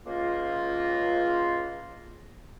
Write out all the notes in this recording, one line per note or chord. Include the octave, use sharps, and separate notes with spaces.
C#2 A#3 F4